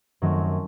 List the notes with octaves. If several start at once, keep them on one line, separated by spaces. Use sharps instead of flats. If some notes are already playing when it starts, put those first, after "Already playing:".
F#2 D#3 F#3 A3 C4